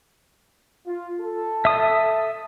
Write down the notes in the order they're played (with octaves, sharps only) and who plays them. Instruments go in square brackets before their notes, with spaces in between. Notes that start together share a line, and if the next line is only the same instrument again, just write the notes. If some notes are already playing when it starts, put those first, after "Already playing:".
[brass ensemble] F4
A4
[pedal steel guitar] E5 D#6